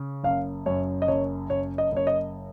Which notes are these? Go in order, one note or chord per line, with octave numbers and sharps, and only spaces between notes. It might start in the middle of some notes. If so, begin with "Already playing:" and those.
Already playing: C#3
F#1 F5
F#2 C#5
D#5
F#1 C#5
F#1 C#5
D#5
F#1 C#5
D#5